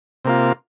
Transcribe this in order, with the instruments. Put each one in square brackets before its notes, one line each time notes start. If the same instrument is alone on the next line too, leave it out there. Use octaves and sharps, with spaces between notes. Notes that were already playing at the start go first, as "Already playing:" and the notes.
[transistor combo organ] C3 A#3 F4